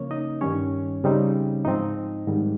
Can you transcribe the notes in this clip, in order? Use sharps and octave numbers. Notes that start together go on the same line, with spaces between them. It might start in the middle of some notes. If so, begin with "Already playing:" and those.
Already playing: C#3 F3 A#3 C#4 C#5
D#4 D#5
G2 D#3 G3 C#4 C#5
C#3 G3 C4 D#4
G#2 F3 C4 D#4 D#5
G#2 D#3 G3